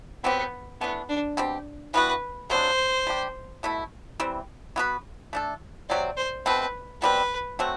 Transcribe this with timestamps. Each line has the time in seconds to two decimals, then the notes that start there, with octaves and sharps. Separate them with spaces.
0.24 F#3 B3 C4 G4
0.81 E3 A3 B3 D4
1.09 D4
1.37 B2 G3 C4 G4
1.94 E3 G3 B3 F#4 B4
2.50 C3 F#3 B3 D4 C5
3.07 G3 D4 G4
3.63 B2 A3 E4
4.20 E3 G3 C4
4.76 E3 B3 F#4 B4
5.33 A3 D4 A4
5.89 C3 F#3 C4 D5
6.17 C5
6.46 B2 A3 C4 B4
7.02 B2 G3 C4 B4
7.59 F#3 A3 C4 F#4